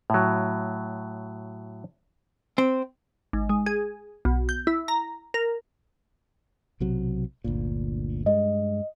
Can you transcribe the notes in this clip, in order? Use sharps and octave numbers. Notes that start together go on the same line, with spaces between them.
A2 F#3
C4
G#1
G#3
G#4
B1
G6
E4
A#5
A#4
B1 C3 F#3
G1 D2 A#2
G2 G#3 D#5